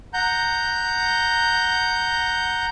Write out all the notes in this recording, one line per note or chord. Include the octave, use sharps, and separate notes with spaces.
F#5 A#5 G6